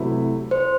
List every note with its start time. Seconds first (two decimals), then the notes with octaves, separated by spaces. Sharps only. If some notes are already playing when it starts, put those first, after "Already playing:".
Already playing: C3 F#3 A3 E4 B4
0.51 C5